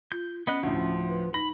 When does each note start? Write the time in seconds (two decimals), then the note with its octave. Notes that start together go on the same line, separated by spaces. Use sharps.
0.12 F4 G6
0.47 B3 C#4 D#5 F#6
0.63 D2 A2 F3
1.09 B4
1.34 D#4 B5 A#6